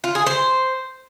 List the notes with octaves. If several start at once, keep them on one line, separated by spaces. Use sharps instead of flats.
F4
G#4
C5